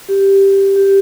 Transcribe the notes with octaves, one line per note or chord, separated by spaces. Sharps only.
G4
G4